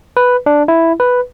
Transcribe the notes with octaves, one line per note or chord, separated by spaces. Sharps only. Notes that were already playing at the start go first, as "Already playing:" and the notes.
B4
D4
E4
B4